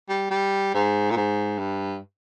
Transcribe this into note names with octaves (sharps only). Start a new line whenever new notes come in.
G3
G3
G#2
A#2
G#2
G2